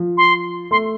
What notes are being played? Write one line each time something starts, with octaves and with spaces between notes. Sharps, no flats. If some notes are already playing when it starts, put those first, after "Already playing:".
Already playing: F3
C6
A3 C6